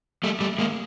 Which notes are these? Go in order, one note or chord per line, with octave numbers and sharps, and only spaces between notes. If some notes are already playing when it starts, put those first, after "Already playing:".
G3 A3
G3 A3
G#3 A#3